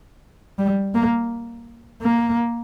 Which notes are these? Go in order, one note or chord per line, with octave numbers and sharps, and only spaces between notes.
G3
A#3
A#3